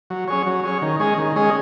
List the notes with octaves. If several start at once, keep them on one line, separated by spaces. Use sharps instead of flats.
F#3
C#4 G#4 C#5
F#3
C#4 G#4 C#5
D#3
G#3 C#4 G#4 D#5
D#3
G#3 C#4 G#4 D#5